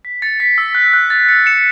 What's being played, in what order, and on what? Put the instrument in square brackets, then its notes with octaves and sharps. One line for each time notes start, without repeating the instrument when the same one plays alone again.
[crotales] B6
A6 C#7
B6
E6
F#6
F#6
A6
A6 C#7
C#7 E7